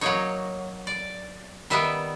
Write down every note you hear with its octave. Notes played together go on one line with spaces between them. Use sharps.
F#3 A#3 D#4 C#5
D5
D#3 G3 B3 E5